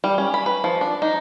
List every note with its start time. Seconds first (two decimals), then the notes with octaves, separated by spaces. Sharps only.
0.04 G3
0.18 C#4
0.34 B5
0.46 B4
0.64 F3
0.81 D4
1.02 D#4